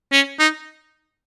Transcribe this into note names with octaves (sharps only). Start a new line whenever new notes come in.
C#4
D#4